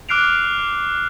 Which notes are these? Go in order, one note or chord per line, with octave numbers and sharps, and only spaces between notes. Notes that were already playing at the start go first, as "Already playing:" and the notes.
D6 F6 F#6 C7 D7 F7